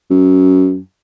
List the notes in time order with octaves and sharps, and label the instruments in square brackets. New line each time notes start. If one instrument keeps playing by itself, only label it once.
[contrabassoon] F#2